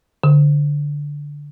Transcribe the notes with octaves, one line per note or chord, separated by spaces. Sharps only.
D3